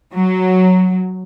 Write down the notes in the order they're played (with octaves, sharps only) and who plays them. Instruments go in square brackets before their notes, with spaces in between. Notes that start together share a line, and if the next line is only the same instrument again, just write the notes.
[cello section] F#3